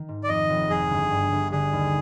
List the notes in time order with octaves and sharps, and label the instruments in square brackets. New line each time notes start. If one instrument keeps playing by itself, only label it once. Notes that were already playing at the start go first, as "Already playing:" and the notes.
Already playing: [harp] D#3
G#2
[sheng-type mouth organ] D5
[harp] F2 [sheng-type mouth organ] D#5
[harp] F1
[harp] F2 [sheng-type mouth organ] G#4
[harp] G1
G2
G1
[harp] D3 [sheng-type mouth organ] G#4
[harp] D#2